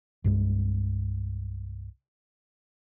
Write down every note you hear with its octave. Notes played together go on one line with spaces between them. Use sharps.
C2 G2 G#3